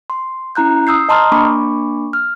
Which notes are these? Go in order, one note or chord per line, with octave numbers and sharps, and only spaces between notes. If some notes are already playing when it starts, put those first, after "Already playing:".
C6
C#4 E4 A#5 F#6 G6
D#6 E6 G6 C7
D#5 A5 A#5 C6 D#6 F6
A#3 D4 B5 C#6 D6
F6